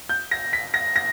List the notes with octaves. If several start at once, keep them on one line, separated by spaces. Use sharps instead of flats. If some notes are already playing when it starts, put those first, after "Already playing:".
G6
A#6
B6
A#6
A#6